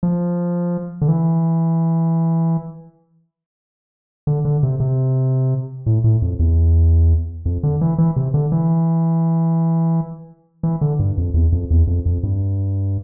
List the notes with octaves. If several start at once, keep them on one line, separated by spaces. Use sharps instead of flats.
F3
D3
E3
D3
D3
C3
C3
A2
A2
F2
E2
F2
D3
E3
E3
C3
D3
E3
E3
D3
G2
F2
E2
F2
E2
F2
F2
G2